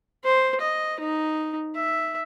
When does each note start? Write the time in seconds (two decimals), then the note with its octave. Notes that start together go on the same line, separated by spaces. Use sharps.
0.24 C5
0.61 D#5
0.99 D#4
1.75 E5